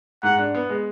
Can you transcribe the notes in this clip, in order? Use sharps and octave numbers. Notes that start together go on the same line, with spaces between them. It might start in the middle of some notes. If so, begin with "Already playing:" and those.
G#2 F#5
D4
B3
G#3